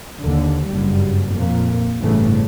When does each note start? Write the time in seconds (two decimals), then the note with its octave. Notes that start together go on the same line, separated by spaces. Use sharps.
0.20 D#2 D3
0.67 F#1 G2 G3
1.35 F2 A#2 A#3
2.02 G1 A2 C#3 E3 A3